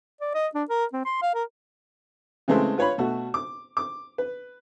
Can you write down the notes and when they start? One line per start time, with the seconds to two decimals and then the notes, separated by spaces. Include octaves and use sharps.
0.21 D5
0.35 D#5
0.55 D4
0.70 A#4
0.93 C4
1.05 C6
1.22 F5
1.35 A#4
2.48 C#3 E3 G#3 A3 C4
2.78 F4 B4 C#5 F5 B5
2.98 B2 A3 F#4
3.34 D6
3.77 D6
4.18 B4